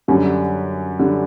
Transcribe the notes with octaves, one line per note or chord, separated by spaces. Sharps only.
F#2 D3 G3
D3 G3